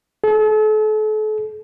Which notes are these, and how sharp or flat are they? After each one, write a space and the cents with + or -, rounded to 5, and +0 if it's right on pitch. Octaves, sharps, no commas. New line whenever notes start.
A4 -40